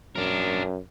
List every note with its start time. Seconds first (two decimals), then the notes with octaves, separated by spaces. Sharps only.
0.16 F#2 D4 A#4